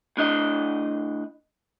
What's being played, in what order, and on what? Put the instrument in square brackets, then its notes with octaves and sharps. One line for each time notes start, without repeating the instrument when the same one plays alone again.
[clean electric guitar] A2 D4 D#5